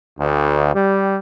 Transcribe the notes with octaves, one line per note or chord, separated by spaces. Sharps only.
D2
G3